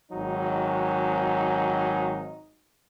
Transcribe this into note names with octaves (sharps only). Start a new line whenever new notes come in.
G#1 F#3 D#4